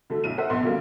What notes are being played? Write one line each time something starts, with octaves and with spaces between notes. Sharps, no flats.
D3 F#3 A3
B1 E4 D#7
A#4 C5 E5 F#5
F1 A#1 B3 C6
D3 F#3 G3 A#3 C#4